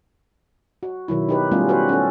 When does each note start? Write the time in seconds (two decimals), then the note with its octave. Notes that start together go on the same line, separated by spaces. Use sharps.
0.83 F#4
1.08 B2 D#3 F#3 E4
1.29 D#4 G4 B4
1.51 G3 A3 B3 C#4 F4
1.69 F#4 B4 C5
1.89 C#4 A4